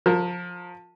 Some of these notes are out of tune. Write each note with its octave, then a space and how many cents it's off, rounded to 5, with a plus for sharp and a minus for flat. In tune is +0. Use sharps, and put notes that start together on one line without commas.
F3 +20 A#4 -5